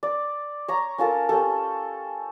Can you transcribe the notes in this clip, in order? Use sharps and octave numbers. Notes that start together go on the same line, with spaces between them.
D5
C#5 A#5
C#4 F4 A4 A#4
C#4 G4 A4